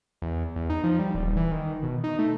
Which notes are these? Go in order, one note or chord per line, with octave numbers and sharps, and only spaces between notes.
E2
E2
D#4
F3
G3
D#1
E3
D#3
B2
D#4
A3